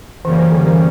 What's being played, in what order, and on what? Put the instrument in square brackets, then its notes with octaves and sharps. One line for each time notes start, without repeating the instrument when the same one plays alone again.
[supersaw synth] F#2 C#3 G3 A#3 C#4 [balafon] E3
[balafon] E3
D3
E3